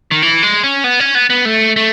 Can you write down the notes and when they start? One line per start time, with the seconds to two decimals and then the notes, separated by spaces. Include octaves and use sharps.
0.11 D#3
0.22 E3
0.43 G#3
0.63 C#4
0.84 B3
1.00 C#4
1.15 B3
1.30 B3
1.45 A3
1.76 A3